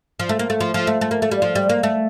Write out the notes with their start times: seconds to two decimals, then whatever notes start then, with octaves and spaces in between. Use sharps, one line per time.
0.19 F3
0.29 A3
0.39 A#3
0.50 A3
0.60 F3
0.74 F3
0.87 A3
1.01 A3
1.11 A#3
1.22 A3
1.31 G3
1.42 F3
1.55 G3
1.69 A#3
1.83 A3